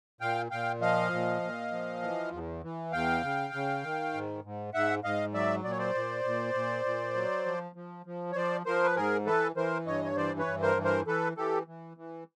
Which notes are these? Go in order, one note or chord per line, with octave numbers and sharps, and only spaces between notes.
A#2 F5 G5
A#2 F5 G5
F3 D#5 F5
A#2
A#2
F3
E3
E2
E3
E2 F5 G5
C#3
C#3
D#3
G#2
G#2
G#2 E5 F#5
G#2 D#5 F5
F#3 D5 E5
A#2 D5
C#5
C5 D5
A#2
A#2
A#2
A#2
F#3
F3
F3
F3
C#5
F3 C5 D5
F3 A#4 C5
B4
G#2 G#4 A#4
E3 A4 B4
E3 A#4 C5
G2 C#5 D#5
C#5
E3 C5 D5
B4 C#5
G2
A#4 C5
E3
A#4 C5
E3 A4 B4
E3 G4 A4
E3
E3